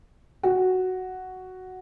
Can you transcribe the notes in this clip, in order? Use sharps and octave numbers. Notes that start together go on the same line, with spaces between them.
F#4